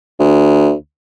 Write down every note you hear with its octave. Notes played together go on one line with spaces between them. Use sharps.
D2